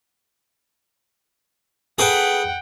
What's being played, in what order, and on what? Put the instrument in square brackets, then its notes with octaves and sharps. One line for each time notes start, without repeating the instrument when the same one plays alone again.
[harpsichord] G#4 A4 B4 [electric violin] F#5 G5